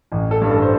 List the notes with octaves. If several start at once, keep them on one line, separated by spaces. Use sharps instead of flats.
A1
A4
G2
A4
C5